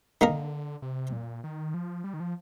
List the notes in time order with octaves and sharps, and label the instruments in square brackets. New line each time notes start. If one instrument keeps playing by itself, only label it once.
[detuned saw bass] D3 [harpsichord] D#3 A#3 D#4 A#4
[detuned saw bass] C3
A#2
D#3
F3
G3
D#3
F3